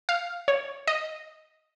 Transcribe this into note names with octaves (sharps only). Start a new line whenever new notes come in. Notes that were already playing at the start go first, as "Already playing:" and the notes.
F5
C#5
D#5